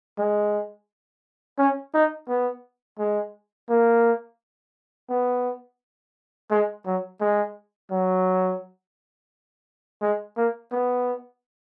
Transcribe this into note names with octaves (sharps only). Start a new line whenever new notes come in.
G#3
C#4
D#4
B3
G#3
A#3
B3
G#3
F#3
G#3
F#3
G#3
A#3
B3